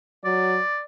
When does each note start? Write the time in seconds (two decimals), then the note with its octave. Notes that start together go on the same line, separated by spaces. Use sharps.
0.25 F#3 D5